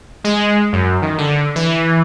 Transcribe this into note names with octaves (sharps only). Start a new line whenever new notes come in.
G#3
F#2
D#3
D3
E3